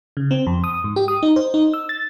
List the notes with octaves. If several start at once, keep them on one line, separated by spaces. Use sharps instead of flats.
C#3
C4
F2
D#6
G#2
G4
D#6
D#4
C5
D#4
E6
A6